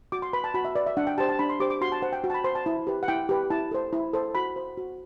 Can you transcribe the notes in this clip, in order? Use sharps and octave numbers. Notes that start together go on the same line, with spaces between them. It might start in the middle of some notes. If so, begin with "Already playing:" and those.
F#4 D6
C6
B4 B5
A5
F#4 B5
E5
B4 D5
E5
D4 F#5
G5
G4 C5 A5
A5
D4 B5
C6
G4 C5 D6
D6
F#4 C6
A5
C5 F#5
G5
F#4
A5
B5
C5 C6
A5
E4
G4 B4
F#5
E4 G5
G4 B4
E4 A5
A4 C5
E4
A4 C5
F#4 B5
C5
F#4